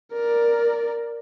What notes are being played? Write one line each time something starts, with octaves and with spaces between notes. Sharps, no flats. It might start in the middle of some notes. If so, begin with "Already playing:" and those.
A#4 D5